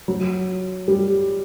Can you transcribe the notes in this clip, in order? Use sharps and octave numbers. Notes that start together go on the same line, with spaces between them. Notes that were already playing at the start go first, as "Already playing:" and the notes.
F#3
G3